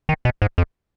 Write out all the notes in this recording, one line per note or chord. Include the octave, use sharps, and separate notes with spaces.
D#3
B2
G#2
F2